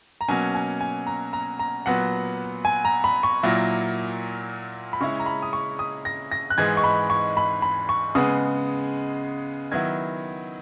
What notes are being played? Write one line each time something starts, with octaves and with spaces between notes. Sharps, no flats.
A#5
B2 F#3 A#3 C#4 G#5
G#5
G#5
A#5
A#5
A#5
A#2 F#3 B3 F#5
G#5
A#5
B5
C#6
A#2 F#3 A#3 E4
B5
C#3 G#3 C#4 E4 C#6
A#5
B5
D#6
C#6
D#6
A#6
A#6
F#6
G#2 E3 G#3 D#4 G#6
C#6
B5
C#6
B5
B5
C#6
C#3 G#3 B3 D#6
D#3 F#3 B3 E4 G#6